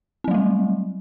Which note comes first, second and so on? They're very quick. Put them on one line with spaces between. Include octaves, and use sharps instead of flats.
C4 F#3 A3 G3